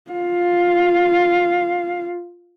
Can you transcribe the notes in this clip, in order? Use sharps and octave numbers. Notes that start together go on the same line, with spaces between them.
F4 F5